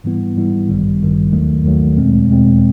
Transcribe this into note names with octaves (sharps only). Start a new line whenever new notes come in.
G#2 E3 G3 B3 E4
G#2 E3 G3 B3 E4
A1 G2 D#3 G3
A1 G2 D#3 G3
D#2 D#3 F#3 A3
D#2 D#3 F#3 A3
E2 B2 G#3 C4
E2 B2 G#3 C4